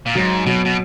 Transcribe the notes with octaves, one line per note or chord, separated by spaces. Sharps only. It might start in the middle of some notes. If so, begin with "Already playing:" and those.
A#2
G#2 F#3
B2 F#3
B2